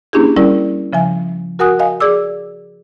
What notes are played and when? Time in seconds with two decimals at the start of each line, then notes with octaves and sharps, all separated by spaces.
0.13 A#3 C#4 D4 E4 G4 G#4
0.36 G3 C#4 E4 A#4 D5
0.93 C#3 F3 E5 G#5
1.59 F#4 A#4 F#5 G#5 D#6 F#6
1.79 D#5 F5 G#5
2.00 G#4 D5 D6 E6